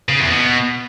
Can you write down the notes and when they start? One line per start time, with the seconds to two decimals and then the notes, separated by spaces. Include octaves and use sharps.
0.09 C#3
0.20 E2
0.31 B2